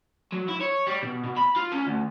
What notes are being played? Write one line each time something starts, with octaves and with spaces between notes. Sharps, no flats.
F#3
E4
C#5
G3
B2
B2
B5
F4
C#4
D2